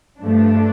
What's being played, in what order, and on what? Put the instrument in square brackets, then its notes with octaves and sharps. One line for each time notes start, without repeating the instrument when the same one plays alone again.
[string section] G2 F3 A3 D4